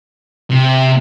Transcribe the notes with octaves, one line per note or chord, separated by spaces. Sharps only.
C3